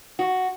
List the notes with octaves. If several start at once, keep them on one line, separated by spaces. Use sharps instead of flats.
F#4